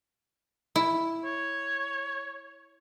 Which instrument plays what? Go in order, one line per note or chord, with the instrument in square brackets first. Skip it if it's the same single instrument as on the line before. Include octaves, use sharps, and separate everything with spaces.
[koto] E4
[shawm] C#5